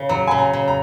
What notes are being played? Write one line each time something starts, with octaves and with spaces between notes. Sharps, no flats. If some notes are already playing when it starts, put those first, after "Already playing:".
Already playing: C#3
F#3 A#5
C#3 G#5
A#5
C#3
A#5